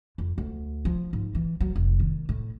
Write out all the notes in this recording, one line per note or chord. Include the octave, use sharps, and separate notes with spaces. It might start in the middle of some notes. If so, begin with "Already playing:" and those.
F2
D2
F3
G#2
E3
F#3
F1
D#3
A2